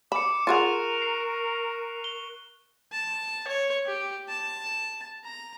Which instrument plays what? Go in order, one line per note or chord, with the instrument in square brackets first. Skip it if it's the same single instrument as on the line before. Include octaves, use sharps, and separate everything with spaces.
[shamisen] B5 [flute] D6 [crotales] C#7 E7
[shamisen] F4 G#4 F#5 [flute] A#4 [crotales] C#6 F#6 F7
[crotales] C7
G7
[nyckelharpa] A5
C#5
G4
A5
A#5